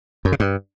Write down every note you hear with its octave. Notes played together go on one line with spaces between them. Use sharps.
F#2
C#3
G2